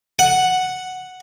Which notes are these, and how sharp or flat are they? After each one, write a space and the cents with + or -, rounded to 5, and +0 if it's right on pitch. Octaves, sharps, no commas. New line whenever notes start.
F#5 +0